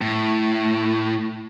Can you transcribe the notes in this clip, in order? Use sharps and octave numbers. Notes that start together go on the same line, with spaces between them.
A2